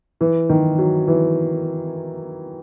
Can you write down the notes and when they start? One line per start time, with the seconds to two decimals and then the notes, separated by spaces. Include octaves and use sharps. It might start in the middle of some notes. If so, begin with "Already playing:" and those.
0.21 E3
0.49 D#3
0.78 F#3
1.08 E3